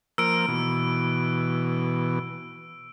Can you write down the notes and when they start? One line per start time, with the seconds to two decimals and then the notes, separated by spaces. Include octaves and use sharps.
0.18 F3 A#3 A#4 E6 D7
0.48 B2 E3